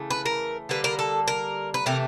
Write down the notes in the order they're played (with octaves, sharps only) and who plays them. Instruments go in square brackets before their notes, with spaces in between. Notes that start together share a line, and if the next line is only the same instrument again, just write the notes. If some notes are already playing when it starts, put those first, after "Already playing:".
Already playing: [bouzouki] C#3 E3 A3
B4
A#4
D3 G3 A#3 B4
A#4
A4
A#4
B4
C3 E3 A3 A#4